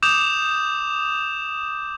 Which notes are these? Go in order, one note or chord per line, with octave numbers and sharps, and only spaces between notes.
D6 D#6 G6 E7 F7